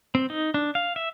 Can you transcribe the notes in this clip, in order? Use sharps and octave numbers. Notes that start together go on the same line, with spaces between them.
C4
D#4
D4
F5
E5